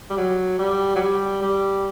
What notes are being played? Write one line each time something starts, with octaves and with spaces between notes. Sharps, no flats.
G3
F#3
G3
F#3
G3
G3